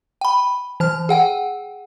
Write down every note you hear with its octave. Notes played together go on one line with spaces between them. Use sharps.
G5 B5
E3 A5 F6
G#4 F#5 G5